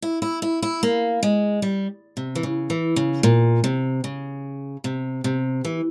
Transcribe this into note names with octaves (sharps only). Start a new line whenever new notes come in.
E4
E4
E4
E4
A#3
G#3
G3
C3
E3
C#3
E3
C#3
A#2
C3
C#3
C3
C3
E3